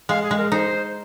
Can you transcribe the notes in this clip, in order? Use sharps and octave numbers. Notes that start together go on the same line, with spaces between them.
G#3 F5
G#4
G#3
A#4
D#4 C5